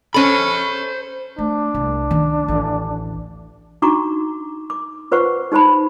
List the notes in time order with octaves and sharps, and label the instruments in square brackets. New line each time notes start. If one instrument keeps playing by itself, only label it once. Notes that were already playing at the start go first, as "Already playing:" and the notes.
[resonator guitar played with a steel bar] C#4 A4 [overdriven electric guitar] C5 B5
[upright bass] A3 [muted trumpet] D4
[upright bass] C2
D#3 C#4
A1 D2
[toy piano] D4 D#4 F#4 A#5 C#6 D6
D6
F4 B4 C5 F#5 C#6
D#4 G4 C5 A5 B5